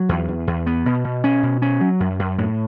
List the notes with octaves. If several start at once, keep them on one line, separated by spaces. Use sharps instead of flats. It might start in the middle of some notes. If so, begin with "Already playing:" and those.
Already playing: F#3
E2
E2
E2
B3
B2
B2
C#4
B2
C#4
F#3
F#2
F#2
A2